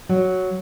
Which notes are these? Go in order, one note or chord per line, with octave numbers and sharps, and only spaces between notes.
F#3